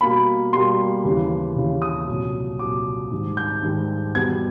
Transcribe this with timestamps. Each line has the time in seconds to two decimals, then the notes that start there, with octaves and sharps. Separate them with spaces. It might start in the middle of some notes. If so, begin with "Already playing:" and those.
0.01 B2 G3 A#3 B5
0.53 B2 G3 A#3 C6
1.05 D#2 C#3 E3
1.56 D#2 C#3 E3
1.82 D#6
2.08 C2 A#2 F#3
2.59 C2 A#2 F#3 D6
3.12 G#2 D#3 G3
3.37 G6
3.63 G#2 D#3 G3
4.14 E2 B2 G3 B3 G#6